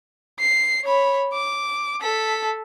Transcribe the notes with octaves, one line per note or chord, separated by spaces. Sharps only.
C7
C#5 B5
D6
A4 B6